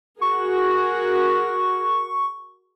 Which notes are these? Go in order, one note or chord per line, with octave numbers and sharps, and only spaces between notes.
F#4 G#4 A#4 C#6